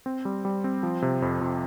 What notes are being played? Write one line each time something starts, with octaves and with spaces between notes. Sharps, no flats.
C4
G3
G3
C4
F3
C3
F2
F2